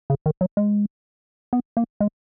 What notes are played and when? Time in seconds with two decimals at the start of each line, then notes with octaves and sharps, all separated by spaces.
0.10 C#3
0.26 D#3
0.41 F#3
0.57 G#3
1.53 B3
1.77 A#3
2.00 G#3